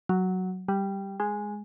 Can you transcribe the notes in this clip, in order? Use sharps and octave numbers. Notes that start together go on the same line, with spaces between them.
F#3
G3
G#3